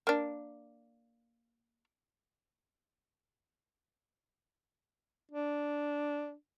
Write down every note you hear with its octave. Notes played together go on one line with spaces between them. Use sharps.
A#3 D4
D4